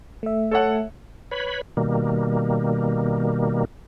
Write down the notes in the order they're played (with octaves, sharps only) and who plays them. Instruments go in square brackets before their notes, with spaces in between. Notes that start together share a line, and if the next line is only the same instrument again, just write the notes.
[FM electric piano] A3 E5
[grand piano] A4 C#5 F#5
[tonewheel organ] B4 C#5 B5
B2 D#3 G3 A#3